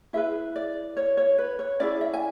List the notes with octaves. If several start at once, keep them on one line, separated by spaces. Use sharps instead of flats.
E4 G#4 B4 E5
D5
C#5
C#5
B4
C#5
C#4 E4 G#4 D5
E5
G#5